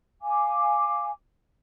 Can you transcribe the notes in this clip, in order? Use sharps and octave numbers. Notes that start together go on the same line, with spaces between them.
F5 G#5 D6